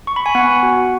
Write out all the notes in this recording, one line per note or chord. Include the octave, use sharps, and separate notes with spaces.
C#6
B5
G#5
B3 F#5
F#4